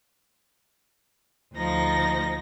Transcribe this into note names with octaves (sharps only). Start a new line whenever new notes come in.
D2 F3 D#4 A#6